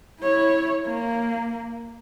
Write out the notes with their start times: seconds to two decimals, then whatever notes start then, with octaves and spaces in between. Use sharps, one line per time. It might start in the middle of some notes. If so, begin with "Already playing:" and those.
0.21 E4 C#5
0.87 A#3